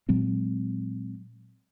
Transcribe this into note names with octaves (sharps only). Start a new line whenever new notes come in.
A#2 F#3 G#3 C4